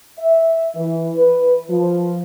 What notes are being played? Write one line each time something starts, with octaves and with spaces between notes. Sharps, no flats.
E5
E3
B4
F3